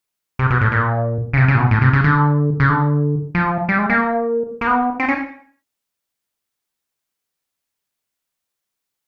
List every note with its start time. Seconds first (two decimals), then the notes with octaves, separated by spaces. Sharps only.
0.39 C3
0.50 B2
0.61 A2
0.72 A#2
1.33 C#3
1.37 C3
1.48 C#3
1.55 A#2
1.59 B2
1.71 A2
1.81 C3
1.93 C#3
2.04 D3
2.60 C#3
2.69 D3
3.35 F3
3.69 G3
3.79 G#3
3.90 A#3
4.61 A#3
4.67 B3
5.00 C4
5.09 C#4